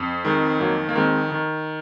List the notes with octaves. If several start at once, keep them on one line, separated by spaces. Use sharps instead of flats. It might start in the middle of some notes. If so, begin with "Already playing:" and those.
Already playing: F2
D#3 G#3
F2 F#3 A#3
A#3
D#3 G#3 C4
D#3